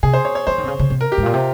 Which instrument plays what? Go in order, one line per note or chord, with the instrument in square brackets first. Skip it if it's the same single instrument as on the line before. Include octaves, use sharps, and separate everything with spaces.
[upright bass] C3 [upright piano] G#4
[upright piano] C5
C#5
C#5
[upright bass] F3 [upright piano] C5
[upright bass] D#3
C3
C#3
C#3
C3
[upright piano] A#4
G4
[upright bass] G#2
[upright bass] A#2 [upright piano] F4
[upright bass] C3